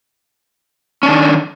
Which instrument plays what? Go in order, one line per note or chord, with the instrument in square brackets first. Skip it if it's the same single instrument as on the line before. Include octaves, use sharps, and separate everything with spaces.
[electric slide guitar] C#4
D4
D#3